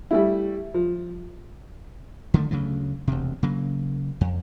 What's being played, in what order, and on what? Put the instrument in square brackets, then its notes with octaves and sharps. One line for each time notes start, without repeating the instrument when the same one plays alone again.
[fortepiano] G3 A3 E4
F3
[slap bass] D3 D#3 G3 A3
D2 C#3 F#3 A3
E1 D2 C3
C#3 F#3 A#3
F2